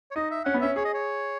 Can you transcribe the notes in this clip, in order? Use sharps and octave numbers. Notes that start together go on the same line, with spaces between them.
C#5
D#4 D#5
E5
C#4 F#5
B3
C#4 E5
G#4 C#5
D#5
C#5